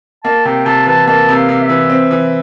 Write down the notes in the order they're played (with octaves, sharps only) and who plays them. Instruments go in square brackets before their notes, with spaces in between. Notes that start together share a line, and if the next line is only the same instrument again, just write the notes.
[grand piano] A#3 [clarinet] A5
[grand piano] C3 [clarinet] G5
[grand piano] C3 [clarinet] A5
[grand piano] E3 [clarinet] A5
[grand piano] A#3 [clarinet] A5
[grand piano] C3
[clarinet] F5
[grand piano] C3
[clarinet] E5
[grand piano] E3
C4
E3